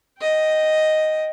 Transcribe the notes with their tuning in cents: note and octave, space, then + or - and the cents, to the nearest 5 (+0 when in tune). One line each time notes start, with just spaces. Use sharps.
D#5 +0 G5 -5